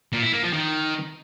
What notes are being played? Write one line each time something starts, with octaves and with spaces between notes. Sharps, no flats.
A#2
E4
A#3
F3
D#3